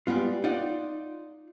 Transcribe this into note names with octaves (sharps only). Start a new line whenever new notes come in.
G3 G#3 B3 F4
D#4 F4 D5 F#5